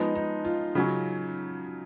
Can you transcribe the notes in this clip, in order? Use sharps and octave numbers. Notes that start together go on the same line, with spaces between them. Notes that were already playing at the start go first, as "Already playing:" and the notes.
Already playing: F3 G#3 B3 D#4
D#4
F4
C#3 F#3 C#4